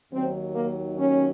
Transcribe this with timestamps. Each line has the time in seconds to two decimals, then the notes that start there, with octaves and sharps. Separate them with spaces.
0.11 D#2 D#3 F#3 C4
0.55 A#3
0.99 C#4